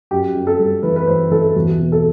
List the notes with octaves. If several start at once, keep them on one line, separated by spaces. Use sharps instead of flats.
F#2 G4
F#2
A4
G3
E3 B4
B4
E3 C5
E3 A4
E2 F#4
B2
A4